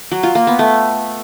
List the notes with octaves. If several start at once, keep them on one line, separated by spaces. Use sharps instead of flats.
F#3
F4
A#3
B3
A3